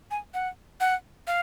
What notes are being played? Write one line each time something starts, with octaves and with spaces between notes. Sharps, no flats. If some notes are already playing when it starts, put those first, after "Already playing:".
G#5
F#5
F#5
F5